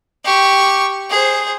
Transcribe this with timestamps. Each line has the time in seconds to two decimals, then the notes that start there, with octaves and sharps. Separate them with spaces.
0.25 G4 C#6
1.10 G#4 C5